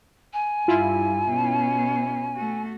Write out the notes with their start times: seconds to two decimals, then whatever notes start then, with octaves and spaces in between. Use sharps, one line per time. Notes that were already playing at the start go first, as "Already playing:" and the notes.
0.33 G#5
0.68 G2 E4 F4
1.29 B2 C#4
2.35 A3 F#4